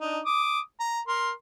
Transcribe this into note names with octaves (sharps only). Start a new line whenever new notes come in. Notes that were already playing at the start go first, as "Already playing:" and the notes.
D4 D#4
D6 D#6
A#5
A#4 C6